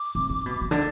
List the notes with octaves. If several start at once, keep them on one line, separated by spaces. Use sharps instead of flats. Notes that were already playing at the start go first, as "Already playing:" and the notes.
Already playing: D6
C3
D3
B2
C3
D3